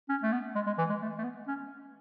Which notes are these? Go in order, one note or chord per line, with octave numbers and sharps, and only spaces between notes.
C#4
A3
B3
G#3
G#3
E3
G#3
A3
A3
B3
C#4